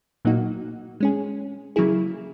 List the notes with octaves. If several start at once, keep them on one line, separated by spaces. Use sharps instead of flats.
A#2 F#3 A#3 D#4 F#4
G#3 C#4 G#4
C#3 F#3 A#3 E4 G#4